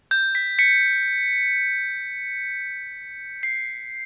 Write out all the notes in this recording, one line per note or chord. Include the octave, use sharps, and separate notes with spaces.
G6
B6
B6 C#7
C7